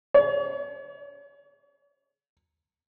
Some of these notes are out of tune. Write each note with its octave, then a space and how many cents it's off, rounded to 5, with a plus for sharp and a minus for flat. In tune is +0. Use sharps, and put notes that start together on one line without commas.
C#5 +40